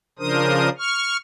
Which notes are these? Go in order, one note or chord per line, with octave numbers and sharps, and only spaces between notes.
C#3 F3 D4 A#4 C5 D#6
C#6 F6